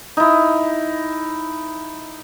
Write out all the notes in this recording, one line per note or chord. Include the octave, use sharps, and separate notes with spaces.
D#4 E4